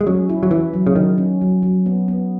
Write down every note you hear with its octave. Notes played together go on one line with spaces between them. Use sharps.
G#3
F#3 C#4
E4
F#3
E3 E4
F#3
C#3
D#3 F#3
C#4
F#3
F#3
B3
B3